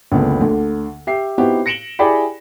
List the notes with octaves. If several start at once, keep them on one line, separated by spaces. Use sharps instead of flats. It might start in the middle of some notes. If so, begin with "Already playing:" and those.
F#1 C#2 D3 B3 A4
D2 D3
G4 E5 C7
B3 C4 D#4 E4 F#4 G4
A#6 C#7 D7 E7 F#7 G7
E4 G4 G#4 D5 G5 B5